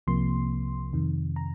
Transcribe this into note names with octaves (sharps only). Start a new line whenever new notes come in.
C2 C3 F3 A#3 C6
F2 C3 D#3
A#5